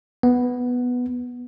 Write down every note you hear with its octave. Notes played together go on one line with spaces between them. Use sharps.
B3